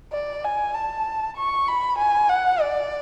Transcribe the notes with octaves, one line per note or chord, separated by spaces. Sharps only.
D5
G#5
A5
C#6
B5
G#5
F#5
D5